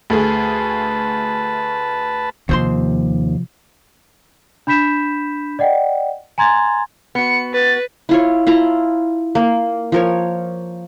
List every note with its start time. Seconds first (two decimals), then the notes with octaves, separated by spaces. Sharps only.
0.10 D2 A3 G#4 B4 A5
2.49 D#2 C3 F3 C5 C6
4.67 D4 B5 G6 B6 E7
5.59 D5 D#5 F#5 G5
6.38 G#5 A#5 C6 G#6 A6
7.15 B3 F#4 C#7
7.53 B4 A6
8.09 E4 F4 C#5
8.46 E4 F4 A5 A#5
9.35 A#3
9.92 F3 A#4 C#5